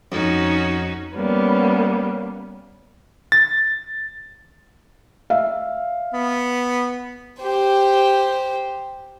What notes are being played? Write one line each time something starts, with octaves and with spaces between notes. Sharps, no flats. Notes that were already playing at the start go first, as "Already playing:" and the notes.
F2 C#4 D#4 F#4
G3 A#3 B3 C#4
A6
E5 F5
B3
G4 C5